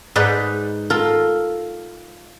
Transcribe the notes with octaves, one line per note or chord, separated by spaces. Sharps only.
G#2 D#4 B4 D5
F4 A4 A#4